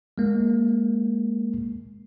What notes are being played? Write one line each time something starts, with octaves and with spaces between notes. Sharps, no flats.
G#3 A#3